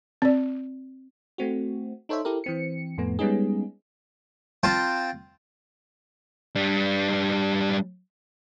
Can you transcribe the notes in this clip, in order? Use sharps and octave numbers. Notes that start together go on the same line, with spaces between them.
C4 D5
A3 C4 F#4
D#4 A4 C5 C#5 E5
E4 G4 A4 A#4
E3 C4 C#7
F2 A2 A3 B3
G3 G#3 B3 C#4 D#4 G#4
C4 F4 G5 A5
G3 D4